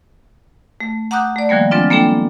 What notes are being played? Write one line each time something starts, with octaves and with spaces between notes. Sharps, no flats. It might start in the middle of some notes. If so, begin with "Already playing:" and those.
A3
F#5 A#5 D6 D#6 F#6 G6
A3 D5
D#3 F3 G3 A#3 B3
F#3 G#3 C4 D4 F4
A#3 B3 D4 A4 G5